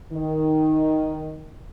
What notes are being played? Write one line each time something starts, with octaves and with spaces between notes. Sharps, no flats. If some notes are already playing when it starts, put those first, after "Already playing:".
D#3